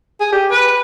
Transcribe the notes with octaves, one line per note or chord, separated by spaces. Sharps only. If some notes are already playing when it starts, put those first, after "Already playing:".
G#4
G4
B4